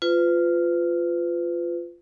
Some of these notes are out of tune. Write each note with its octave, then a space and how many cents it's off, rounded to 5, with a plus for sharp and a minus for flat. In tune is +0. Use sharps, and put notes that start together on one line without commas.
F4 -5 B4 +35